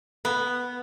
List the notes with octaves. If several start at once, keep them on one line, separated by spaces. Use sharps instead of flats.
B3